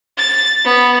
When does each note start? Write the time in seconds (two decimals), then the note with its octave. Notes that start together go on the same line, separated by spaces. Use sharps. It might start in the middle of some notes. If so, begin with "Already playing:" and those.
0.18 A6
0.65 B3